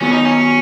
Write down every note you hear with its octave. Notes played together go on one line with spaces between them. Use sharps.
D#3 F#3 B3 C#4 F#4
D#4
C#4